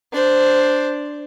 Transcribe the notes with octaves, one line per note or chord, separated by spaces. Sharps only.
D4 C5